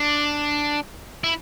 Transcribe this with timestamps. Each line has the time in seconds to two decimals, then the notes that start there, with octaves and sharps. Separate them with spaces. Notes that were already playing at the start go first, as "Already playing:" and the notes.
Already playing: D4
1.24 E4